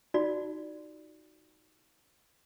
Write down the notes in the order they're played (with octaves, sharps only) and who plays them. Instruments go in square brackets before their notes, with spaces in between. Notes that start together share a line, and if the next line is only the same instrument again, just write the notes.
[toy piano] D#4 F4 F#4 D5